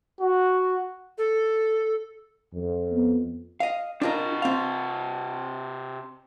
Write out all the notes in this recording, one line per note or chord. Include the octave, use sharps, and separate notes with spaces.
F#4
A4
F2
B3
D#5 F5
C3 D4 F4 A#4 D#5
C4 F5